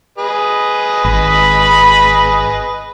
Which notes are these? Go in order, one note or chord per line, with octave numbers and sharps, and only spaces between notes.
G#4 B4 D#5
G#1 B5